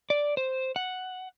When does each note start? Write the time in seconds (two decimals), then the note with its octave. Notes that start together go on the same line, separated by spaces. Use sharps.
0.10 D5
0.37 C5
0.76 F#5